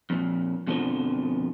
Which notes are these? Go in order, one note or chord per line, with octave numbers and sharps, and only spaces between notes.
F2 A#2
F2 B2 D3 D#3 F3